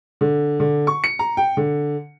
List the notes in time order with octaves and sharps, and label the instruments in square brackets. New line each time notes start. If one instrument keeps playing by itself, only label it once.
[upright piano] D3
D3
C#6
C#7
A#5
G5
D3